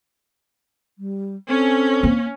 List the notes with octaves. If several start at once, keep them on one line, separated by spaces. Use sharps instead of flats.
G3
C4 C#4 A4
A#3